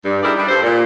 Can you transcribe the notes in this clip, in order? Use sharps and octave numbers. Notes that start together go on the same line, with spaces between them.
G2
D#4 E4 G4 G#4 A#4 D5
G3 D4
G2 A4 C5
A#2